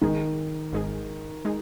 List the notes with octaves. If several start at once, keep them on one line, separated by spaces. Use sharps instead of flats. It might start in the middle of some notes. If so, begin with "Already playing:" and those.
G#1 G#2 D#3 G#3 D#4 G#4
G#1 G#2 G#3 D#4 G#4
G#3 D#4 G#4